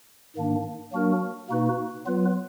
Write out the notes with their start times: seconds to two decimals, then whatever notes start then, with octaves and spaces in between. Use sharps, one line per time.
0.36 G#2 D#3 A#3 D4
0.92 F#3 A#3 D4 F#4 A#4
1.50 B2 A#3 D#4 F#4 B4
2.06 F#3 B3 F4 B4